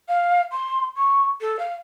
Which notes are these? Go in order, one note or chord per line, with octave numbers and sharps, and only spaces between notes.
F5
C6
C#6
A4
F5